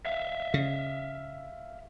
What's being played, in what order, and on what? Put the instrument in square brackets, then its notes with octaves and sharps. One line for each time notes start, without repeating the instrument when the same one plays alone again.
[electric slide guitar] E5 F5
[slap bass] C#3